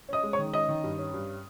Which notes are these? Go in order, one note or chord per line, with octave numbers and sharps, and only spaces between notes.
C#4 D#5 D#6
G#3
C#5 C#6
D#3
C#4 D#5 D#6
D#3
G2
C#4
G2